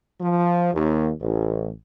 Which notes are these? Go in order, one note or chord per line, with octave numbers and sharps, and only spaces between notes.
F3
D#2
A1